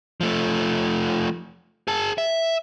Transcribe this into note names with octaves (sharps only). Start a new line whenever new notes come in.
F3 A3
G#4 A5
E5